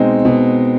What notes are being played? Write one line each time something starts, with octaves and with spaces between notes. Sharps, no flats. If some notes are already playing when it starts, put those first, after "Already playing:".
Already playing: B2 G#3 C4 D#4
B2